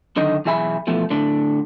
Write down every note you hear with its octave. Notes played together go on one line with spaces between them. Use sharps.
F#2 D3 D#3 D#5
B1 E3 G#4 E5 G#5 B5
B2 E3 F3 A3
A2 D3 D4